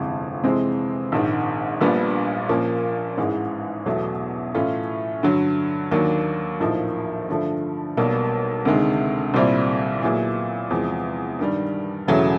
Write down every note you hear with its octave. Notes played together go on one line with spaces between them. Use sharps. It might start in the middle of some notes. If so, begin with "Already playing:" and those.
Already playing: G1 F2 C3 E3 G#3
F2 C3 E3 G#3 C4
A#1 G#2 D#3
A#1 A#2 G3 B3 D4
A#2 F3 A#3 C#4
A1 G#2 E3 G#3
E2 B2 F#3 A3
A2 E3 A3 C#4 F4
G2 D3 F#3
D#2 D#3 F#3 A#3 D4
A#1 A2 F3 A#3 D#4
G2 D3 F3 A3
B1 B2 G3 A#3
D2 C3 D#3 G#3
C2 A#2 G3 C4 E4
A#2 F#3 B3 E4 G#4
E2 C3 F3 G#3
G2 D#3 G3
E1 E2 C#3 F#3 A3